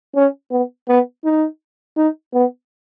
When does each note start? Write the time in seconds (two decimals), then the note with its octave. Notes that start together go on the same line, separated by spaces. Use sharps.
0.16 C#4
0.51 B3
0.88 B3
1.24 D#4
1.97 D#4
2.34 B3